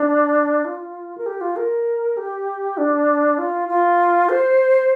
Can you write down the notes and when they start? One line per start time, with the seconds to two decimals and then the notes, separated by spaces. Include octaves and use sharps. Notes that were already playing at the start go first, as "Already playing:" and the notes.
Already playing: D4
0.65 F4
1.18 A#4
1.26 G4
1.41 F4
1.56 A#4
2.17 G4
2.77 D4
3.38 F4
3.69 F4
4.29 C5